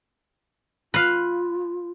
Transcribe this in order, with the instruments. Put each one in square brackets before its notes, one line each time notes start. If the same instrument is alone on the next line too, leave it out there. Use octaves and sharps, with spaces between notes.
[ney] F4 [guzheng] B4 F5